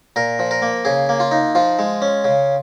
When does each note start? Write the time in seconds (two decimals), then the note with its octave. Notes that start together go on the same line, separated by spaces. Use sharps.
0.16 A#2 A#4
0.39 F3
0.51 A#4
0.62 A#3
0.85 C#3 G#4
1.09 A#3
1.20 F4
1.31 D#4
1.55 F3 F4
1.79 G#3
2.02 C#4
2.25 C#3